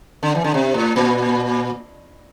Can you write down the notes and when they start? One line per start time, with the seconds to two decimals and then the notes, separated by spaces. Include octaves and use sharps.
0.23 D3
0.35 E3
0.44 D3
0.54 C3
0.74 A2
0.96 A#2